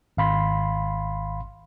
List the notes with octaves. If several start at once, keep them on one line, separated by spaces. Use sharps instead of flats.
G#1 F5 B5 C6